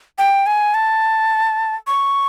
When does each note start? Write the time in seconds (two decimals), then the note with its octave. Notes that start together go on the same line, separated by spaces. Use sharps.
0.18 G5
0.46 G#5
0.74 A5
1.87 C#6